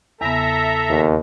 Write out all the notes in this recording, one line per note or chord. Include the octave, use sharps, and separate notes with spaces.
E2 C#3 B3 A4 E5 A#5
D#2